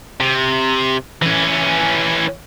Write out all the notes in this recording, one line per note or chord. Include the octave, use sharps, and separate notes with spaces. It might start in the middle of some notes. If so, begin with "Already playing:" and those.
C3
E3 C#4